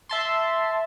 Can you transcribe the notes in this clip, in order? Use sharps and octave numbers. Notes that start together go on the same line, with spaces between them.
E5 A5 C6